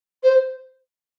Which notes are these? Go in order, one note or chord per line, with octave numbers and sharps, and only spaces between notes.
C5